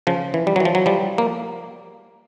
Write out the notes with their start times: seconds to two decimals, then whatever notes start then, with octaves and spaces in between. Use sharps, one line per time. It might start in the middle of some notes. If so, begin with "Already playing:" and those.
0.07 C#3 F3
0.34 E3
0.47 G3
0.56 F#3
0.60 E3
0.65 F3
0.75 F#3
0.86 F3 G3
1.18 A#3